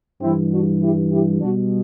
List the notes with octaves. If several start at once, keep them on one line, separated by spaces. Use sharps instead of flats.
G2 E3 G3 C4 E4
D4 F#4
E4 G4
E4 G4
B2 G3 D4 F#4